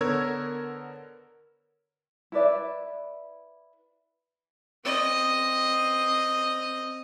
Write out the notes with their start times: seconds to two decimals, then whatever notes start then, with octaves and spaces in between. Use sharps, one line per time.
0.01 D3 B3 A#4 C#5 E6 G#6
2.32 E4 B4 D5 E5
4.85 C4 D#5